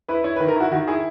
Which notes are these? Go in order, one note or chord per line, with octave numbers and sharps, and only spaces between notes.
E4 B4
E4 C#5
B4
D#3
A#4
E4 F#4
D#3 F#4
E4 G#4